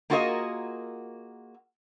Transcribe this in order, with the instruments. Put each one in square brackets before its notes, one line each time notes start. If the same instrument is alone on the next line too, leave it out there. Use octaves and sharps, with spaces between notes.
[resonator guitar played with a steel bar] A#3 F4 F#4 G#4 A#4 D#5